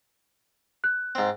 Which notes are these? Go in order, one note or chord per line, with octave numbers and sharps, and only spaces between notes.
F#6
G#2 C4